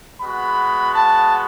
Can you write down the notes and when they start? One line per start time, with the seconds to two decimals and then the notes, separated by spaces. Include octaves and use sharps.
0.21 G#3 B3 F#4 B5
0.95 A5